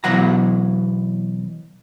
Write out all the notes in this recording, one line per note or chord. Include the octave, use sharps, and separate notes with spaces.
B2 E3 F#3 F#5 A#5